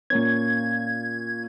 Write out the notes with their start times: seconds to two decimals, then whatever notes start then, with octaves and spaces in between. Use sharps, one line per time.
0.10 A#2 A#3 C#4 G#6